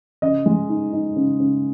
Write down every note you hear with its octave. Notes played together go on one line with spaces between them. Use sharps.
C#3 D#5
G#3
D#4
D#4
C#3
C#3